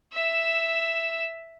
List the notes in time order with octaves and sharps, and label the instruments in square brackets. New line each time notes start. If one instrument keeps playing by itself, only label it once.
[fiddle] E5 E6